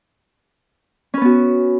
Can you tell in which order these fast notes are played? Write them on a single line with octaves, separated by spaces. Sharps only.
C#4 B4 B3 F#4